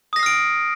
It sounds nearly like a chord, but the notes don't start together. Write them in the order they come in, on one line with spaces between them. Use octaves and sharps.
D#6 A#6 C7 F6 D7